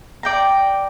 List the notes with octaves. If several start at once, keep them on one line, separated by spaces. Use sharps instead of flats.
D5 G5 A#5